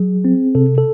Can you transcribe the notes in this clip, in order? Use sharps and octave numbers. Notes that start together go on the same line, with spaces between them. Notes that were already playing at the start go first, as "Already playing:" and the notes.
Already playing: F#3 G#4
C4
C3 A4
A4